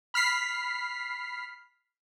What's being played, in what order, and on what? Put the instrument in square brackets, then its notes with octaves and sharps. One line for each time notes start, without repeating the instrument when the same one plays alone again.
[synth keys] B5 F6 B6 C7